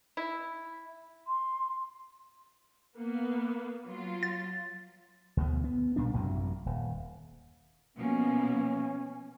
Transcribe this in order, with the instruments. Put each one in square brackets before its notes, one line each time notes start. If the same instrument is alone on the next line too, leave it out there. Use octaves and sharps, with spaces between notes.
[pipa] E4
[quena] C6
[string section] A#3 B3
F#3 F4
[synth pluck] A6
[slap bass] D2 B2
B3
B1 A#2 G3 D4
A1 F#2 C3 F#3
D#1
[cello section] B2 F3 A#3 [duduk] C#4